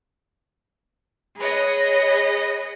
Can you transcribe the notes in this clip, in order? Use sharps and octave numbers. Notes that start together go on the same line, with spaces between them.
G#4 B4 C#5 D#5